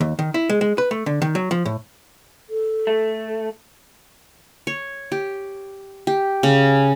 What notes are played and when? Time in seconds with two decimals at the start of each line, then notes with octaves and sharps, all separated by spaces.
0.01 D#2
0.19 D#3
0.34 E4
0.49 G#3
0.61 G#3
0.78 B4
0.91 A3
1.06 D3
1.22 D#3
1.35 F#3
1.51 F3
1.65 A2
2.50 A4
2.87 A3
4.67 C#5
5.12 G4
6.07 G4
6.43 C#3